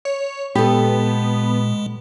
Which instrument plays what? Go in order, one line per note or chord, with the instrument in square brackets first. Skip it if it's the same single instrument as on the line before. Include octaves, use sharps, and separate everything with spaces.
[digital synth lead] C#5
[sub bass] A#2 [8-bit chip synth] G#3 [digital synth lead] B3 [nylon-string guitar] G4 A4